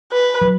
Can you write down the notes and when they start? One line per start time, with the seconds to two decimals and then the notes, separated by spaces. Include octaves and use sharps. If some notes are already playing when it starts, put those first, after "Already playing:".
0.13 B4
0.41 F#3